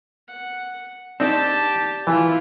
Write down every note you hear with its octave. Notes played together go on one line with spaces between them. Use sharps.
F#5
C4 D4 D#4 G4 A5
E3 E4 F4